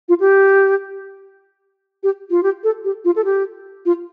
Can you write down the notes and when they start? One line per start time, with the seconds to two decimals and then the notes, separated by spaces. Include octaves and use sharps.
0.09 F4
0.20 G4
2.03 G4
2.30 F4
2.43 G4
2.64 A4
2.84 G4
3.05 F4
3.16 A4
3.25 G4
3.86 F4